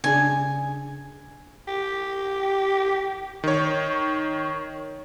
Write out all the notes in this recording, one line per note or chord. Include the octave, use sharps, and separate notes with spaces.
C#3 D4 G#4 G#5
G4
D#3 C#5